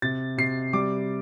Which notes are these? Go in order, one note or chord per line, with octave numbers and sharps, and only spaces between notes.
C3 A6
C3 C7
G3 D6